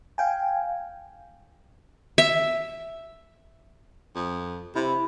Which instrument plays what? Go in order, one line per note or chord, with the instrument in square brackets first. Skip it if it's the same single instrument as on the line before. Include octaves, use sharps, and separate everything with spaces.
[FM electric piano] F5 G5 G#5
[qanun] E5
[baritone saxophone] F2
[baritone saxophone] C3 [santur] E4